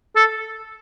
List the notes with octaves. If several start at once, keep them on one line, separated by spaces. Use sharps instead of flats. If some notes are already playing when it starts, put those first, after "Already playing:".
A4